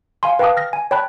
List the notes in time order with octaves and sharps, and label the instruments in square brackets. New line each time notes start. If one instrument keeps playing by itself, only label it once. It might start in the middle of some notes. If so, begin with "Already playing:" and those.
[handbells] F5 G#5 C6
B4 F5 G5 A5 D6 D#6
F6 A#6
G#5
C#5 G5 A5 B5 F#6